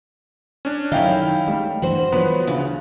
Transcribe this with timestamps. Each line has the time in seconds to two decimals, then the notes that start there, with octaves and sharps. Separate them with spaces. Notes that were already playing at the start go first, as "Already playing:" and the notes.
0.65 C#4 D4
0.92 F1 F#2 D#3 C#4 D#4 E4 F5 G5
1.48 G3 A3
1.82 G2 E3 F#4 C5
2.12 E3 F3 B3 B4 C#5
2.47 D2 C#3